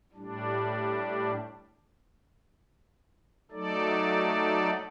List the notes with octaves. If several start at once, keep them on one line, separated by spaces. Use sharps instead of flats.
A2 G3 D4
F#3 A3 D#4 A4 D5